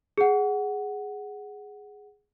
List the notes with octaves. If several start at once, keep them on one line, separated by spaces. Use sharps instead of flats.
G#4 F#5